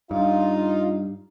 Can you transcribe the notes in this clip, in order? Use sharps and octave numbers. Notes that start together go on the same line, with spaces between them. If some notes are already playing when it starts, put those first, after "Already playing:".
G2 D#4 F4 F5